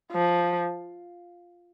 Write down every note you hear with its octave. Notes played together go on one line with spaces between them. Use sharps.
F3